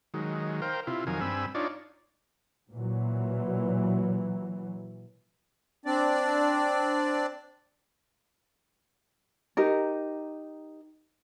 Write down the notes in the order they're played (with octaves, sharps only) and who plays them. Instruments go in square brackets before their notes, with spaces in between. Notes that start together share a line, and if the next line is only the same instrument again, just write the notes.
[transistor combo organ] D#3 F#3 G#3
A#4 C5 F5 G5
C3 E4 F4
F2 D#3 F#3 A#4 F5 G#5
G2 C4 G#5 B5 E6
D4 D#4 F4 C#5 D5
[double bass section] A#2 E3 F#3
[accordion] C4 D4 D5
[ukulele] D#4 G4 A#4